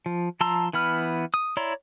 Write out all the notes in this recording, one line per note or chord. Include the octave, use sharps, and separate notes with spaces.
F3
F3 A5 A#5 C6 E6
E3 B3 B5 F6
D#6
E4 C#5 D5 A#5 C6